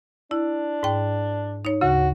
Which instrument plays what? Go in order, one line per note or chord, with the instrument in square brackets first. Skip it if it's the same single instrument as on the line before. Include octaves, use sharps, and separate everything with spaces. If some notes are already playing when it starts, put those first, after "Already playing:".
[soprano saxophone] D4 [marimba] E4
[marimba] G#2 G5
D#4 C#5
[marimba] D2 C#3 [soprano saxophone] F#4